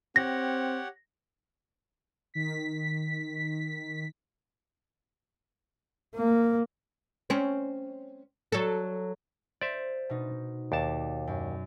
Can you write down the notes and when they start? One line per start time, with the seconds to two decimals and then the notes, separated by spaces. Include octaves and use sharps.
0.16 C4 G4 C#5 F#5 A#6
2.34 D#3 B6
6.16 A#3
7.30 C4 C#4
8.52 F#3 A4
9.61 C5 D5 E5
10.10 B2 D#4
10.72 D#2 D5 A5
11.27 F#2